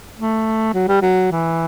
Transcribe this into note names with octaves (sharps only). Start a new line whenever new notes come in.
A3
F#3
G3
F#3
E3